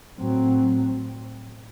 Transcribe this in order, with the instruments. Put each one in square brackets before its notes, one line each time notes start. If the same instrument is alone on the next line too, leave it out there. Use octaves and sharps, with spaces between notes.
[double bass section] A2 F#3 C4